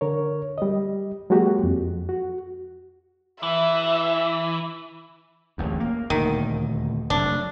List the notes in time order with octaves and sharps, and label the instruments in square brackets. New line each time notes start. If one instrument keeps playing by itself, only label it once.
[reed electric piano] D3 A#4 C#5
G3 D#5
F#3 G#3 A#3 F#4 G4
F2
F#4
[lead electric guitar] E3 [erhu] E5
[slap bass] D1 A1 D#2
A#3
[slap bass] D#1 D2 [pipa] D#3
[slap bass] F1 F#3 A3 [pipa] D4